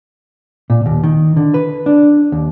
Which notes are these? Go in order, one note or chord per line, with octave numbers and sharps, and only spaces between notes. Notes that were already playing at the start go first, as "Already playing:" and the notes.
A#2
D#2
D#3
D3
B4
D4
D#2